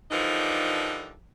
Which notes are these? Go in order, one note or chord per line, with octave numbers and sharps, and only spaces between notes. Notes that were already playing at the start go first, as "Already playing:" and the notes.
D3 E3 F3 G3 D#4 A#4